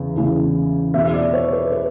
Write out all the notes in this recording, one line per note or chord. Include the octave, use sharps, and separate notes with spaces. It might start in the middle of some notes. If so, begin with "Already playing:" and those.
Already playing: E2 C#3 E3
E2 C#3 E3
E2 B2 E5
E5
D5
C#5
B4
B4